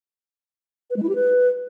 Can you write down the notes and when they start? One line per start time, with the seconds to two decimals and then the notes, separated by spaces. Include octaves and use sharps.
0.90 B4
0.96 G#3
1.03 E4
1.09 G4
1.15 B4